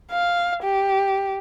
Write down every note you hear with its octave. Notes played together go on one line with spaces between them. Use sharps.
F5
G4